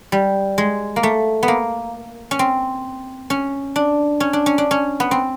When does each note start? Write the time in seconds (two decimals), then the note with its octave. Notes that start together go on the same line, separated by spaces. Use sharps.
0.12 G3
0.58 G#3
0.96 A#3
1.03 A3
1.43 B3
1.48 A#3
2.31 C#4
2.39 C4
3.30 C#4
3.76 D4
4.20 C#4
4.33 D4
4.46 C#4
4.58 D4
4.71 C#4
5.00 B3
5.11 C4